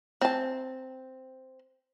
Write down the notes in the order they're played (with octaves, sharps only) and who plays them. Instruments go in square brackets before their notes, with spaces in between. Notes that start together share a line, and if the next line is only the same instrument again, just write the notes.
[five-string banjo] C4 A5